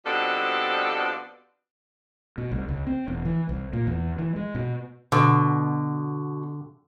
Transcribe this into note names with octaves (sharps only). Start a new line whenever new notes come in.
B2 F3 G3 C4 D4 A4
B2
C2
C#2
C4
E1
E3
C2
A#2
E2
E3
G#3
B2
B2 D3